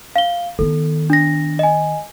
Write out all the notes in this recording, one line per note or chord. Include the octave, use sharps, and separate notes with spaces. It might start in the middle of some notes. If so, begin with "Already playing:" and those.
F5 G7
D#3 B3 A4
D4 A#6
D#5 G#5